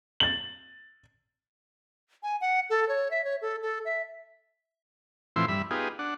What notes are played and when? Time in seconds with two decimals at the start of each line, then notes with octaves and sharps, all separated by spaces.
0.20 A6 F#7
2.23 G#5
2.41 F#5
2.70 A4
2.89 C#5
3.11 E5
3.24 C#5
3.41 A4
3.62 A4
3.85 E5
5.36 A2 E3 F3 C4 E4 C6
5.48 G2 E5 B5
5.71 B3 D#4 F4 G4 G#4
5.99 D4 F#5